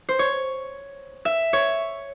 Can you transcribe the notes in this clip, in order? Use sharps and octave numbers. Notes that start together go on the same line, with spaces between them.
C5
C#5
E5
C#5